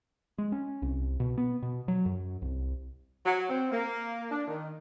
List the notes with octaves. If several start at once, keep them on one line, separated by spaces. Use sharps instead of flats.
G#3
C#4
C2
B2
B3
B2
F#3
F#2
C2
F#3
C4
A#3
D4
D#3